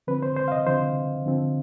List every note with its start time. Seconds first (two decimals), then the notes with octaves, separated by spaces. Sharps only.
0.07 D3 F3 C4 B4
0.23 C5
0.36 C5
0.48 F5
0.52 D#5
0.66 D3 F3 C4 C5
1.26 D3 F3 C4